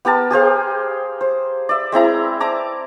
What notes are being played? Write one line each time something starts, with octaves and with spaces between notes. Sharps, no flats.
B3 G4 A#4 A5
G4 G#4 C5 F5
C5
D5 E5
G#3 C4 E4 A#5
D5 A5 A#5 D6